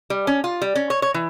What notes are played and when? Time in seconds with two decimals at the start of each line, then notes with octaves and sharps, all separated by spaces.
0.10 G3
0.27 C#4
0.44 F4
0.62 G3
0.75 C#4
0.90 C#5
1.02 C#5
1.14 E3